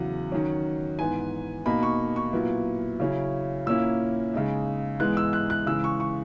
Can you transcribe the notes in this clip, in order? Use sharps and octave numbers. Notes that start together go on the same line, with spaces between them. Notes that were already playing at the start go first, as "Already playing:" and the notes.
Already playing: E2 C#3 F#3 F#5
D#3 F#3 C#4
G#2 E3 B3 G#5
B2 A#3 D#4 B5
C#6
C#6
A#2 F#3 B3 E4
C#3 F#3 C#4 E4
A#2 A#3 C#4 E4 E6
C#3 G#3 D#4
G#2 E3 G#3 B3 D#4 F#6
E6
F#6
F#6
C#3 E3 G#3 E6
C#6
C#6